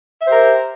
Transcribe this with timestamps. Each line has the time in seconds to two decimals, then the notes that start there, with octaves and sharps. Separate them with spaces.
0.22 E5
0.25 C5
0.28 G4
0.32 A#4